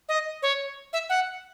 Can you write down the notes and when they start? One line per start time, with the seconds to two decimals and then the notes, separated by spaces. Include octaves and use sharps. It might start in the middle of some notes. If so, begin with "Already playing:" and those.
0.09 D#5
0.42 C#5
0.93 E5
1.09 F#5